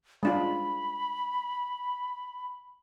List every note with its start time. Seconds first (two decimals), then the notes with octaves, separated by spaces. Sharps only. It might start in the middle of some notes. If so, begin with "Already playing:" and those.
0.23 G#3 D4 F4 B5